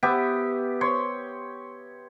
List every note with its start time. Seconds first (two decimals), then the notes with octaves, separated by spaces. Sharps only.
0.03 B3 G4 E5
0.81 C#5 C6